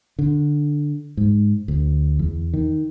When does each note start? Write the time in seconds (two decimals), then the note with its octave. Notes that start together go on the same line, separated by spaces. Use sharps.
0.19 D3
1.17 G#2
1.68 D2
2.19 E2
2.54 D#3